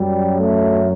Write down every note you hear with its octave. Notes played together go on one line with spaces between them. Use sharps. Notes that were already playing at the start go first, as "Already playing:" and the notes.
Already playing: F#2 F#3 G3
A3